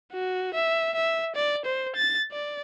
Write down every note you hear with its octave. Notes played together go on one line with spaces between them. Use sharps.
F#4
E5
E5
D5
C5
A6
D5